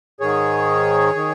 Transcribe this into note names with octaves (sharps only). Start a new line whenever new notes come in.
G#2 D#3 G#4 C#5
D#3